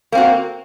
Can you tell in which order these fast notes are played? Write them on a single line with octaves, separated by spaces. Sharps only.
A#3 C4 F#4